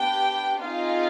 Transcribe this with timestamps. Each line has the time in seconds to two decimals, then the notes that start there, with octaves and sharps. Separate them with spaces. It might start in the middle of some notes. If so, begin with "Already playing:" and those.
Already playing: B3 D4 G4 G5
0.61 C4 D#4 F4 G#4 F5